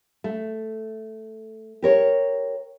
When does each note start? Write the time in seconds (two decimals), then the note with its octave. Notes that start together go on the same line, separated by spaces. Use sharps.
0.24 A3
1.83 G4 A#4 C#5